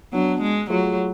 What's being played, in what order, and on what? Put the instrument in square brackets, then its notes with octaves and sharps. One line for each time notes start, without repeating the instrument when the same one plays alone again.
[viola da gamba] F#3 [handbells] B3 D4 F#4
[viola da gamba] G#3
[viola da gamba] F#3 [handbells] A3 F4 G#4 C#5